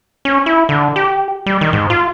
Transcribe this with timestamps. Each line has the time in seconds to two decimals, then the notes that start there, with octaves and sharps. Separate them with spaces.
0.25 C#4
0.46 E4
0.69 D3
0.96 G4
1.46 G3
1.61 D#3
1.73 G#2
1.90 F4